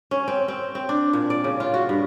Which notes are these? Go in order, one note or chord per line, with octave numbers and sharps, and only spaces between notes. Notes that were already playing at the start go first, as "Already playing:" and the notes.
C#4
C4
C4
C4
D4
A#2
D5
C#3
F4
F#4
G2